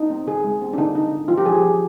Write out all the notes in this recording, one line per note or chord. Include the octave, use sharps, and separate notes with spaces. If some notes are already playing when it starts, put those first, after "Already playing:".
Already playing: D#4
C4
D3 G#4
G#3
C4
D4
D3 D#4
D3 D#4
D3
F3 F4
G4
F3 G#4
G4
F3